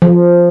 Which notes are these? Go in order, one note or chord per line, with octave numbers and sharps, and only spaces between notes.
F3